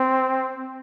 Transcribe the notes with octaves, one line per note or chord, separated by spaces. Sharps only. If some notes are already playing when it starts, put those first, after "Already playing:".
Already playing: C4